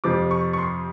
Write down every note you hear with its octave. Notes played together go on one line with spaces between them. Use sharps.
F2 C3 F3 D6
C#6
C#6
C6